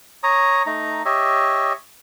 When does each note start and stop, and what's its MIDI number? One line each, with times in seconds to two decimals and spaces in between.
0.23 0.63 73
0.23 0.63 82
0.23 0.63 87
0.66 1.03 57
0.66 1.03 63
0.66 1.03 82
1.05 1.73 67
1.05 1.73 73
1.05 1.73 75
1.05 1.73 76